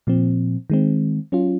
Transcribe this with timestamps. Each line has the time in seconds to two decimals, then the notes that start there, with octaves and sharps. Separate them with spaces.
0.07 A#2 F3 C4
0.70 D#3 G#3 C4
1.32 F#3 C#4 F4